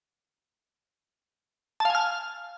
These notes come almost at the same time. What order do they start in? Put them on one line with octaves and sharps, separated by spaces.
A5 F5 G#5 F6